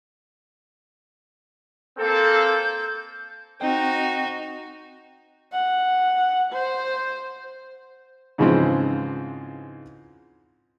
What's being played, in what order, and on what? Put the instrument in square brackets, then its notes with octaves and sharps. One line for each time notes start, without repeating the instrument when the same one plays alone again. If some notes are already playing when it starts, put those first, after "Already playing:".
[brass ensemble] A#3 C4 A4 [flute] G6
[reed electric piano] C4 G5 [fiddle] D#4 F#4
[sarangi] F#5
C5
[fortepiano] G#2 C#3 E3 F3 G#3 C4